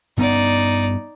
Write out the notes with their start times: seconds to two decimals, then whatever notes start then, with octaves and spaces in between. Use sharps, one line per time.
0.17 G2 B3 C#4 D#4 D5